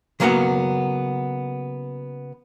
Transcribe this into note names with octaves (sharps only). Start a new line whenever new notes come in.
C#3 F#3 A#3 B3 F5 F#5